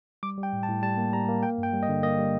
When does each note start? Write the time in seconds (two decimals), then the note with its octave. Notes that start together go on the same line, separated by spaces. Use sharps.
0.23 G3 D6
0.38 G3
0.43 G5
0.53 A2
0.63 A5
0.68 A2
0.83 G3 A5
0.98 A#3
1.13 G3 A#5
1.28 A#3
1.43 A#3 G5
1.58 G2
1.63 G5
1.73 G3
1.83 D#5
1.89 D3
2.03 A#3 D#5
2.18 G3